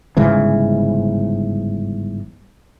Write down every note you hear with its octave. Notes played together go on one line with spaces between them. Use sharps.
G1 G#2 C#3 E3